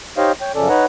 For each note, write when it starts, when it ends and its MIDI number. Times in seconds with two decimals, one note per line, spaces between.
0.17 0.32 63
0.17 0.32 67
0.17 0.32 72
0.17 0.32 73
0.17 0.32 75
0.17 0.32 77
0.41 0.52 73
0.41 0.52 79
0.55 0.68 42
0.55 0.68 49
0.55 0.68 53
0.55 0.68 61
0.55 0.68 69
0.55 0.68 74
0.69 0.86 63
0.69 0.86 71
0.69 0.86 73
0.69 0.86 78
0.69 0.86 82